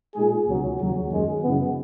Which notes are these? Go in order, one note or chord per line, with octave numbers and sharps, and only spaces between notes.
A#2 G#3 D#4 G#4
C#2 B2 F#3
D#2 C#3 F#3
F#2 D#3 G#3
F#2 C#3 E3 B3